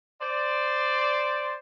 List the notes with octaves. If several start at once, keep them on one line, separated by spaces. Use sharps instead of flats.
C5 D5